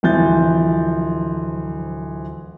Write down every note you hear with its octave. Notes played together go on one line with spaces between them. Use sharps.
D1 E3 F3 G6 A6